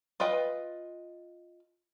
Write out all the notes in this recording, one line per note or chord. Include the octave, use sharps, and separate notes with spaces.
F4 B4 D#5 G5